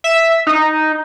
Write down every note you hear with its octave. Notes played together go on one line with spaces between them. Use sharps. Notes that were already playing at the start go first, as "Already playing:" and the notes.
E5
D#4